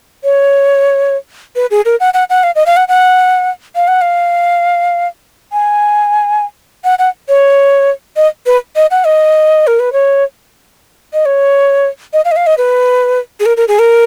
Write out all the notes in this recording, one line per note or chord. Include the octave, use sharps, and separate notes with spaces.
C#5
B4
G#4
A#4
F#5
F#5
F#5
F5
D#5
F5
F#5
F#5
F5
F#5
F5
G#5
F#5
F#5
C#5
D#5
B4
D#5
F#5
D#5
A#4
B4
C#5
D#5
C#5
D#5
F5
D#5
F5
D#5
B4
G#4
A#4
A#4
G#4
A#4